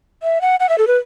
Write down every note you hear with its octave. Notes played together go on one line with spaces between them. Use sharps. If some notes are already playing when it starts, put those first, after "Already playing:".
E5
F#5
F#5
E5
A4
B4